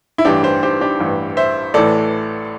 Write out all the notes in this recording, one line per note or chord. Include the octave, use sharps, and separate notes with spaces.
E4
A1 G2 E3 D4 G4
G4 C5
G4 C5
D4 G4
A1 G2 E3
C5 E5
A1 A2 E3 A4 D5